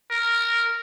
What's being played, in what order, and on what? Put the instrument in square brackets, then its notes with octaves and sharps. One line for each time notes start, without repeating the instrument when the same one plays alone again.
[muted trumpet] A#4